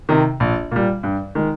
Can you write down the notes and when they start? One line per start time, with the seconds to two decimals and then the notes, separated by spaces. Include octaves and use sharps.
0.09 C3 D#3
0.40 A#1
0.71 A#2 G3
1.03 G2
1.35 D#3 G#3